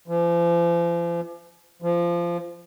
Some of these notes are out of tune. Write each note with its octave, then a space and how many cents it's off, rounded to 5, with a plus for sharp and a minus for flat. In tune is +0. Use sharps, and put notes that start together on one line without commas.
F3 -40
F3 -20